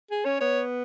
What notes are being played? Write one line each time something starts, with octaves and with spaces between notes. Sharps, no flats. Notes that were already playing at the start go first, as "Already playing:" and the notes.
G#4
C#4 C#5
B3 C#5